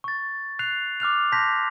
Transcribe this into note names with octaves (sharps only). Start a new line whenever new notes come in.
C#6 A6
F#6 C7 F7
D6 F6 F#6 F7
A5 C6 G6 A#6 B6